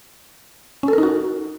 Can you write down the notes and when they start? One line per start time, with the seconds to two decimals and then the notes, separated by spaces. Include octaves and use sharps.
0.83 C#4
0.88 A4
0.93 A#4
0.98 D#4
1.03 F#4